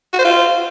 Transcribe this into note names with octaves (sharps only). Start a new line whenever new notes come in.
F#4
C5
F4